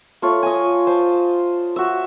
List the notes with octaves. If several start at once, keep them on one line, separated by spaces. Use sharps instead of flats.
A3 F4 C#5
D#5 G#5
C5 A5
F#4 E5